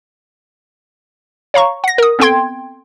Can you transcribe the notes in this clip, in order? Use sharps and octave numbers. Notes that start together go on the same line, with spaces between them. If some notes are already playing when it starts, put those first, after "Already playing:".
C#5 F5 A#5 C#6
F#5 A#6
A#4 D#6
B3 C4 A4 G5 C6 G#6